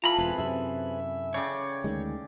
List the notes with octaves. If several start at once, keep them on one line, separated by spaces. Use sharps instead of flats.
E3 F4 A4 A#5 B5
E1 C4 G#4 B4
F#2 C3 E5
C#3 C#5 D5 G5
D2 D#3 G#3